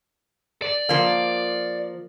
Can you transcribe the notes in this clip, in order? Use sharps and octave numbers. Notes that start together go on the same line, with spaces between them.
D5
F3 A#3